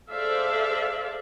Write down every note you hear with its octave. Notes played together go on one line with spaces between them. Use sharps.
G#4 A4 C5 D5 E5 F5